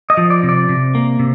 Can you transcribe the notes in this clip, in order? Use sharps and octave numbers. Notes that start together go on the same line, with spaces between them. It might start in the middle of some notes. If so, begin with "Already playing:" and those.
D#5
F3
D5
C3
D5
C3
A#3
C3